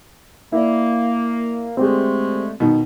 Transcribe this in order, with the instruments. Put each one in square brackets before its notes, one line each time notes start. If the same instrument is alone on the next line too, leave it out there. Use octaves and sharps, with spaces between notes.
[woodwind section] A#3 [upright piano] E4 D5
[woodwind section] D3 G#3 A3 [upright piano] C4 G4 G#4
[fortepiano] B2 D#3